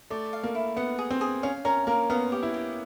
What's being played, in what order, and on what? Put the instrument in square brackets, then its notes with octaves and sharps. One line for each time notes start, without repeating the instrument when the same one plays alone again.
[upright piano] A3 [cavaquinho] D5
[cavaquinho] F5
[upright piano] A#3
[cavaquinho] E4
[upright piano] B3 [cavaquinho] F#5
[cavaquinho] G#4
[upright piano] C4
[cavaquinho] G#4
[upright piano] C#4 [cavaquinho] F5
[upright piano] C#4 [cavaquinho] A#4
[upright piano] A#3 [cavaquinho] A#4
[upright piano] B3 [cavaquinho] F5
[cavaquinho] G4
[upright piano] E4
[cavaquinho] G4